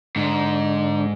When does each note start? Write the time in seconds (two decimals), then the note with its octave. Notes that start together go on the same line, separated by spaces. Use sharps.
0.16 G#2 D3 D4